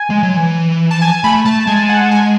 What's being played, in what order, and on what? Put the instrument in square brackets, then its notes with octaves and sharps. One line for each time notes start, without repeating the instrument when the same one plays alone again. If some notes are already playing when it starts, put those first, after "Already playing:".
Already playing: [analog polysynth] G#5
[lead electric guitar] G#3
F#3
E3
[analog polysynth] A5
G#5
G#5
[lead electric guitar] A3 [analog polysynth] B5
[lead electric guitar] A3 [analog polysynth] A5
[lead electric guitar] G#3 [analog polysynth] G#5
[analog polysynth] F#5
G#5